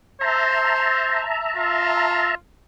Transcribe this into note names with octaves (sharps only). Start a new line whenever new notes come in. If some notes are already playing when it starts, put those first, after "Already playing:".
C5 E5 A5 A#5
F4